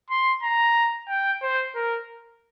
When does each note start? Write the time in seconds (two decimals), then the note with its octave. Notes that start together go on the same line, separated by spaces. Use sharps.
0.10 C6
0.43 A#5
1.09 G5
1.42 C5
1.75 A#4